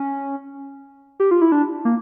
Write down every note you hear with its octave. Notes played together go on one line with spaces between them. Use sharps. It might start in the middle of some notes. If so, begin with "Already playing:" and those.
Already playing: C#4
G4
F4
E4
D4
A#3